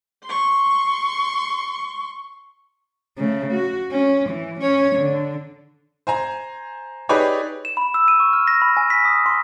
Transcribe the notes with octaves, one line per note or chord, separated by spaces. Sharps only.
C6 C#6
C#3 A3
F#4
C#4
E3
C#4 C#5
D3
C5 G#5 A#5
D#4 G4 G#4 B4 C#5 D5
E7
B5
E6
D#7
C#6
F6
A#6
B5
G#5
B6
D#6
C6